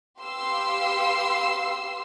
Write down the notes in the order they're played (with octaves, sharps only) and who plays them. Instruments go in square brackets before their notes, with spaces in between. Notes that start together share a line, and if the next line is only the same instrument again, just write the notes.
[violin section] G4 B4 F5 C6 E6 C7